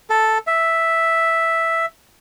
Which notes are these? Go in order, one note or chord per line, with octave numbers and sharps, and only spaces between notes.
A4
E5